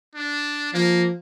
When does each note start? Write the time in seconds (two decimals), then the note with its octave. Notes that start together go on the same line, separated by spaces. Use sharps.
0.15 D4
0.73 F3 A#3